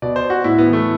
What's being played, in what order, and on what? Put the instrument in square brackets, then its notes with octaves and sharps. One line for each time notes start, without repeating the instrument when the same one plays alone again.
[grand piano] B2 D5
C5
F#4
A2 E4
B3
E3
A3